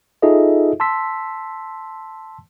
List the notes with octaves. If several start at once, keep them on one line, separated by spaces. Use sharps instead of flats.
D#4 F4 G#4 A4 D#5 E5
A5 C6 E6 B6